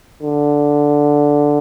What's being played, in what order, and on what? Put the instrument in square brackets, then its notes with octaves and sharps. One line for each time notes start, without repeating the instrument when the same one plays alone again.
[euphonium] D3